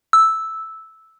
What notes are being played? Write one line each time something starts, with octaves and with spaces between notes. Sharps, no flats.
E6